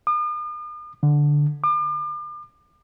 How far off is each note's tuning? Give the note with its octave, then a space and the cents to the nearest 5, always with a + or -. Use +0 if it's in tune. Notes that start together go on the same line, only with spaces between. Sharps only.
D#6 -45
D3 +0
D6 +40